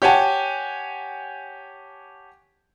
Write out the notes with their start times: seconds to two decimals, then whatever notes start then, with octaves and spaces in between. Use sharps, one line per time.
0.02 G4 C#5 F#5 G#5 A5